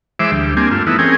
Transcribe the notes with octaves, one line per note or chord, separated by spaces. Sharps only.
E3 G#3 C5 E5 D6
D2 G3
A#3 C4 D4 G4 G#5
G2 A3 F4
E3 A3 B3 D#4 E4
C4 C#4 G#4 A#4 G5 G#5